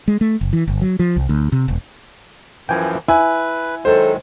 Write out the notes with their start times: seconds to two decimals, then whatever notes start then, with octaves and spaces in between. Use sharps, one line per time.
0.08 G#3
0.21 A3
0.41 F#1
0.53 E3
0.68 G1
0.81 F#3
0.99 F3
1.16 C2
1.29 D2
1.52 C3
1.68 E1
2.69 F#2 E3 F3 G5 G#5
3.08 E4 B4 G#5
3.85 D#3 F#3 G#3 A4 C5